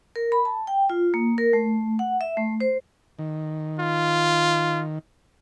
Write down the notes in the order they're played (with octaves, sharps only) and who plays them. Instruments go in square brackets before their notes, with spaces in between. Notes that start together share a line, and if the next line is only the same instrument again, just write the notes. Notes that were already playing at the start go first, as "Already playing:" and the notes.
[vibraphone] A#4
B5
A5
G5
F4
A#3
A#4
A3
F#5
E5
A3
C5
[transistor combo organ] D#3
[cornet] F4